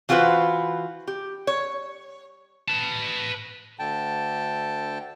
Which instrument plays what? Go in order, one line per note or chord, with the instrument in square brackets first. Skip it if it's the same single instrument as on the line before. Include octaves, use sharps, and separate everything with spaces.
[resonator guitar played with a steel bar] E3 F4 F#4 G#4 B4 C5
G4
C#5
[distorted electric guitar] B4 A5
[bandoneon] D2 D3 G5 A5